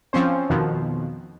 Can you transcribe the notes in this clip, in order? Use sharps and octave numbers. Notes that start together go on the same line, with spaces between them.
F3 C4 C#4 C5
F2 B2 D#3 F3